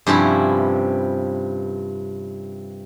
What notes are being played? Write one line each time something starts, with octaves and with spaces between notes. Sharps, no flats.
G2 C3 F3 C#4 E4